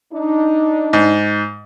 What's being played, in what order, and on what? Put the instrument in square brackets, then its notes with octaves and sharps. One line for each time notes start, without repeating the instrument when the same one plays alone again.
[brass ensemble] D4 D#4
[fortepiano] G#2